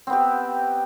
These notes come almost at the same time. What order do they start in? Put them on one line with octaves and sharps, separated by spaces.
C4 B3 G4